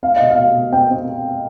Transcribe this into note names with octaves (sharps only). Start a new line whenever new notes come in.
C4 F5
B2 D#5
F5
B2
B2
C4 G5
C4